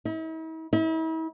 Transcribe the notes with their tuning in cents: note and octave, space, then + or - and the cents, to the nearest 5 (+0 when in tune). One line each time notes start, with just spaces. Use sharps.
E4 -45
E4 -40